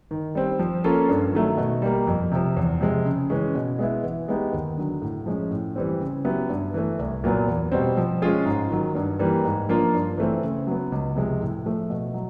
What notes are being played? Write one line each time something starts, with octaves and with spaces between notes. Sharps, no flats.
D#3
G3 C4
F3
A#3 C#4 F4 A4
G2
D#3 F#3 A3
B2
G3 A#3
F2
C3 F3
E2
C3 F3 G#3
C#3
E3 G#3 C#4
B2
G#3 B3 E4
E3
G#3 B3 D#4 G4
D#2
D3 F#3
A2
F3 G#3 C#4
A2
E3 G3 C4
C#3
F#3 B3 E4 G4
G2
E3 A3
C2
A#2 F#3 B3
E2
B2 G3 C4
F3
G#3 C#4 F4 G#4
G#2
D#3 F#3
G2
E3 G3 A#3
G#2
F3 A#3 D4 F4
G2
E3 A3 C4
C#3
F#3 B3
C#2
C3 F3 G#3
A2
F3 A3
B2
F#3